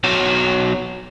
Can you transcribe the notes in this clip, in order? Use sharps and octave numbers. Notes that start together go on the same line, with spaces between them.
B1 F#3